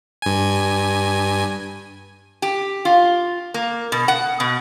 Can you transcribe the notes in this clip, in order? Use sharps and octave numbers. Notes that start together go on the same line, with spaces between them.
G2 G#5
G4
F4
A#3
B2
F#5
B2